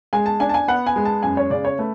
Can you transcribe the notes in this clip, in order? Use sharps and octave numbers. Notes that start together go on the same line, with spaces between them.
G#3 G#5
A5
D4 G#5
A5
G#5
B3 F#5
G#5
G#3
A5
F#2 G#5
C#5
C#3 D5
C#5
A3 B4